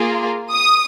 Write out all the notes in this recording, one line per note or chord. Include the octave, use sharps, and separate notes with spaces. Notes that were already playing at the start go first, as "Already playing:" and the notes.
Already playing: A#3 F4 G#4
D#6